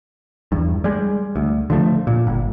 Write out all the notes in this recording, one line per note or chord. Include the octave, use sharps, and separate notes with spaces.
E2 G2
G3 G#3
D2
D3 F3 A3
A#2
G1